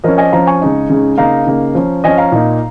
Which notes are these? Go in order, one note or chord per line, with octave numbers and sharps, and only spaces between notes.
F3 C#4 A#4 D#5
D#5 G#5
F3 C#4 F5 A#5
G#5 C#6
C#3 G#3 D#4
C#3 G#3 D#4
C#3 A#3 D#4 F5 A#5
C#3 A#3 D#4
F3 C#4
F3 C#4 D#5 G#5
F5 A#5
A#2 A#3 D#4